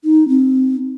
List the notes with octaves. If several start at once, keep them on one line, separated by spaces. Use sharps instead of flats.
D#4
C4